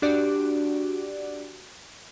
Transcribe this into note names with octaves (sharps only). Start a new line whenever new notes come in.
D4 F#4 G4 D5